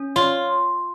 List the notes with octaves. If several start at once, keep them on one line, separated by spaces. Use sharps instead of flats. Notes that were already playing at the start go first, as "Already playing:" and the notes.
Already playing: C#4
F4 C#5